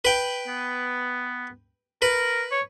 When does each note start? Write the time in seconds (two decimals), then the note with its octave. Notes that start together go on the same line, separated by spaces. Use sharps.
0.05 B4 G5
0.47 B3
2.02 A#4 B4
2.52 C#5